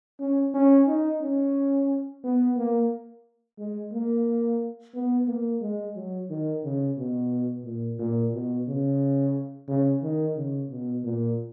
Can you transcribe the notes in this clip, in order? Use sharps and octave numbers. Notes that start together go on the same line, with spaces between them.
C#4
C#4
D#4
C#4
B3
A#3
G#3
A#3
B3
A#3
G#3
F#3
D#3
C#3
B2
A#2
A#2
B2
C#3
C#3
D#3
C#3
B2
A#2